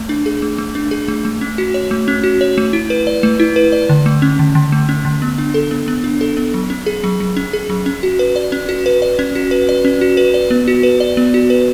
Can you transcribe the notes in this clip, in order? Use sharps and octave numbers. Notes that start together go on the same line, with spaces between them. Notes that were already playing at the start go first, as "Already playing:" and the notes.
Already playing: A3
D4
G#4
A3
A3
D4
G#4
A3
A3
C#4
F#4
C#5
A3
C#4
F#4
C#5
A3
E4
B4
D5
A3
E4
B4
D5
D3
A3
C#4
D3
D3
A3
C#4
D3
B3
D4
A4
B3
B3
D4
A4
B3
F#3
C#4
G#4
F#3
F#3
C#4
G#4
F#3
C#4
F#4
B4
D5
C#4
F#4
B4
D5
C#4
F#4
B4
D5
C#4
F#4
B4
D5
B3
F#4
B4
D5
B3
F#4
B4